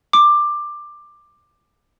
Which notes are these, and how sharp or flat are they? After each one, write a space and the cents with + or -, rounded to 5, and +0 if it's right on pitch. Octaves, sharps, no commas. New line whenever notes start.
D6 +15